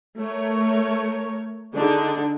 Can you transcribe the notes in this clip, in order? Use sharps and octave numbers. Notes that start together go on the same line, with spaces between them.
A3 A#4 C#5
D3 D4 D#4 G#4